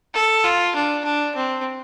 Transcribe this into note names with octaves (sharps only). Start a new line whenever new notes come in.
A4
F4
D4
D4
C4